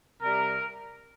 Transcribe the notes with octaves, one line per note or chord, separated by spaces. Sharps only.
C3 G3 A#4